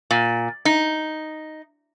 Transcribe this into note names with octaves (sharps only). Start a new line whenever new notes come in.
A#2
D#4